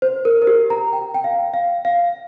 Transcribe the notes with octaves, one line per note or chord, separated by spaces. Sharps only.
C5
A#4
A#4
G4
A#5
G5
G5
F5
F5
F5